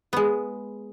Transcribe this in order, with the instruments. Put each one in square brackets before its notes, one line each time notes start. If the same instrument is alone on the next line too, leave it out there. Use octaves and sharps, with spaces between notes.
[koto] G#3 B3